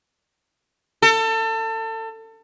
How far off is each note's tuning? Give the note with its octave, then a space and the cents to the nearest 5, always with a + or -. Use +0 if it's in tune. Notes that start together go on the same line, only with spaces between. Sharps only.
A4 +30